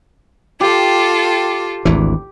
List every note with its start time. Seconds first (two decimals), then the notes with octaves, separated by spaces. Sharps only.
0.61 F4 G4 A4
1.85 G#1 D2 E3